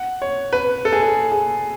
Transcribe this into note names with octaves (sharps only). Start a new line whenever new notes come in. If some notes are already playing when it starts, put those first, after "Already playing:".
Already playing: F#5
C#5
B4
A4
G#4
A4
G#4